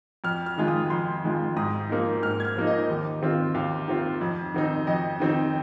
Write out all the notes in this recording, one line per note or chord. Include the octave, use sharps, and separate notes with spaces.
F2 F6
F6
D#3 G#3 F4
D#6
F2 C6
D#3 G#3 F4
G#2 D#6
F3 A#3 D#4
G#2 F6
G#6
F6
F3 A#3 D#4
D#5
D#2
D#3 C4 F4
D#2 F5
D#3 C4 F4
F2
D#3 C4 D#4
F2 D#5
D#3 C4 D#4